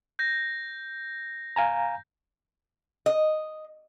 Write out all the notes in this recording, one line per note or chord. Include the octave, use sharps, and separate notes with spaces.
G6 A#6
F5 G#5 A#5
D#5